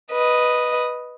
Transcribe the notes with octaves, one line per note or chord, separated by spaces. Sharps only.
B4 D#5